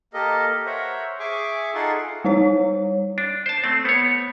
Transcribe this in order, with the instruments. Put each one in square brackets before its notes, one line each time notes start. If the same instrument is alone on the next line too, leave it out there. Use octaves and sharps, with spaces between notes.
[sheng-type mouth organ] A#3 G4 A4 A#4 D#5
A#4 C5 C#5 E5 F#5
G#4 E5 G#5 C#6 D6
D#4 F4 G#4 A4 F#5 C6
[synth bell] G3 D#4 C#5
[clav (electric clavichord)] D4
C5 A5
A3 C4
B3 C#5